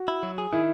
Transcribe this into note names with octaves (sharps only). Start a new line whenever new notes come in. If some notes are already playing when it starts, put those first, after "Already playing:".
Already playing: F#4
E4
F#3
G#4
D#3 E4